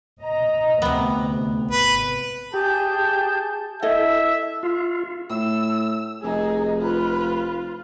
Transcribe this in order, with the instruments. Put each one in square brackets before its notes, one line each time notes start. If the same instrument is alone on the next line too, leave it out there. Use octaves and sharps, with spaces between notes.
[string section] D#5 A#5
[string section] D2 [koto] C3 B3
[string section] G#1 [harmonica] B4
[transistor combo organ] G4 [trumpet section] G#4 A5 [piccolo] G6
[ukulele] E4 A4 D#5 [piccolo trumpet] E5
[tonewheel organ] F4
[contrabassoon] A2 [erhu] E6
[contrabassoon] F1 [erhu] D#4 [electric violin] G#4
[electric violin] F4 [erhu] B4